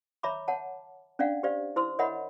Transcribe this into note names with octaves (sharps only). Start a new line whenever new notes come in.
C#5 E5 A#5 B5 D6
C#5 F#5 A5
C#4 D4 D5 F5 F#5
G4 C5 D5 F5
E4 C5 C6 E6
A#4 C#5 D#5 E5 F#5 B5